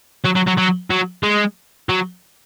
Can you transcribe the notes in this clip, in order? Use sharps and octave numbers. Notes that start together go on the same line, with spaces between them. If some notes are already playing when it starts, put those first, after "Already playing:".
F#3
F#3
F#3
F#3
F#3
G#3
F#3